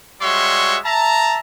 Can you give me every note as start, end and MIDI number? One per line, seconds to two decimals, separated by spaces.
0.21 0.78 55
0.21 0.78 56
0.21 0.78 66
0.21 0.78 73
0.21 0.78 76
0.21 0.78 84
0.85 1.38 76
0.85 1.38 81
0.85 1.38 82